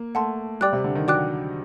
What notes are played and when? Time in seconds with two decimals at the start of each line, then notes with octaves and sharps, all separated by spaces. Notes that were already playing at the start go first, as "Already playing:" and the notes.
Already playing: A#3
0.15 A3 F#5 A5 C6
0.61 G3 D5 G5 D6 F#6
0.73 C3
0.84 D3
0.95 D#3
1.08 F#3 D5 G5 D6 F#6